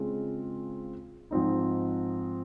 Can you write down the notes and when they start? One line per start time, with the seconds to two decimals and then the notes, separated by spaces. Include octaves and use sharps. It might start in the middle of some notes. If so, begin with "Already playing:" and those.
Already playing: C#3 G#3 C4 F4
1.31 G#2 F3 C4 D#4